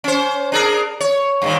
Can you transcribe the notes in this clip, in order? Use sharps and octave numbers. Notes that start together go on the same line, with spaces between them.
C#4 C5
D4 G#4 A#4
C#5
G2 A#2 D#3